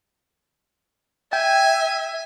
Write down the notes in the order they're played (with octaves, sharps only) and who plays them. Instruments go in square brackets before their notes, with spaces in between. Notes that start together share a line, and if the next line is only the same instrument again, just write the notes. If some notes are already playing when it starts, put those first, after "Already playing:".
[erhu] E5 [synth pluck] G5 [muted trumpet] G#5